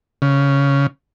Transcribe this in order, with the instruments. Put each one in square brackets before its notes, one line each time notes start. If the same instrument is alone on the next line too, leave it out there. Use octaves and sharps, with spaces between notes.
[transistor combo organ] C#3